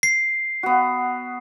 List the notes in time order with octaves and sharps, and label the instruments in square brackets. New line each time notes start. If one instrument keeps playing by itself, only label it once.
[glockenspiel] C7
[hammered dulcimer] B3 F#4